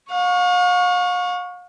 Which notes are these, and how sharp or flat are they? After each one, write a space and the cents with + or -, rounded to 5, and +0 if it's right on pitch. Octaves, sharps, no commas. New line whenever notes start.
F5 +40 C#6 +0